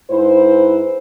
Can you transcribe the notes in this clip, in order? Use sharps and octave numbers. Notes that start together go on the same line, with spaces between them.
G#2 E4 B4 C5